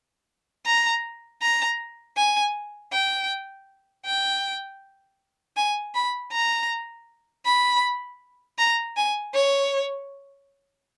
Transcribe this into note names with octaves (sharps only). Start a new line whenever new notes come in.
A#5
A#5
G#5
G5
G5
G#5
B5
A#5
B5
A#5
G#5
C#5